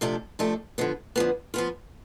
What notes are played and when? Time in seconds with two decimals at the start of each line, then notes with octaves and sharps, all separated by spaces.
0.01 C3 F3 A3 D4 A4
0.39 C3 F3 A3 D4 A4
0.78 D3 F3 B3
1.16 D3 F3 B3
1.54 F3 B3 F4